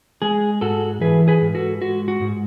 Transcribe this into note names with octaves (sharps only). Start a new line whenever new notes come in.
G#3 G#4
G#2 F#4 A4
E3 G#4 B4
G#4 B4
G#2
F#4 A4
G#3 F#4
F#4
G#2